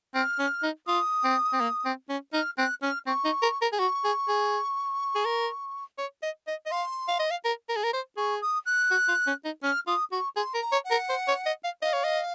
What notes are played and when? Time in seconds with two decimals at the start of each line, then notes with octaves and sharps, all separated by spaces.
0.15 C4 F6
0.39 C#4
0.63 D#4
0.87 F4 D#6
1.24 C4
1.53 C4
1.60 A#3
1.85 C4
2.09 C#4
2.33 D#4 F6
2.58 C4 F#6
2.82 C#4 F6
3.06 C4 C#6
3.25 D#4
3.42 A#4
3.62 A#4
3.72 G#4
3.79 F#4 C#6
4.04 G#4
4.28 G#4
5.15 G#4
5.25 A#4
5.98 C#5
6.22 D#5
6.47 D#5
6.66 D#5
6.71 F5 C6
7.08 F5
7.19 D#5
7.31 F5
7.45 A#4
7.69 A#4
7.76 G#4
7.84 A#4
7.93 C5
8.17 G#4 C#6
8.41 D#6
8.66 F#6
8.91 F#4
9.08 F4
9.27 C#4
9.45 D#4
9.63 C#4 F6
9.87 F4 D#6
10.12 F#4 C#6
10.36 G#4 C6
10.54 A#4
10.61 A#5
10.72 C#5
10.85 F#5
10.91 A#4
11.09 C5
11.28 C#5
11.46 D#5
11.64 F5
11.82 D#5 F5
11.93 C#5
12.04 D#5